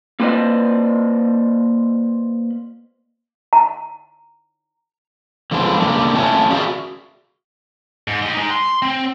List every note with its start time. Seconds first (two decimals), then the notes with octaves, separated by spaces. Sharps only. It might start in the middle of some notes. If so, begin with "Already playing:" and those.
0.20 A#3 F4 B4 C5 D5 D#5
3.53 A#5
5.51 D3 F3 G#3 B3 D4
5.80 C#3 E3 A#3 D4 G4 A4
6.15 F2 A3 C#4 C#5 A5
6.50 F#4 G#4 A#4 D5 E5 F5
8.08 G#2
8.22 G4 D#5
8.34 G#3 D#4
8.51 C6
8.82 C4